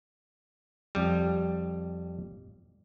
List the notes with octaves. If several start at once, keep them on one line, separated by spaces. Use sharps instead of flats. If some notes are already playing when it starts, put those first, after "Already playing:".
F2 G3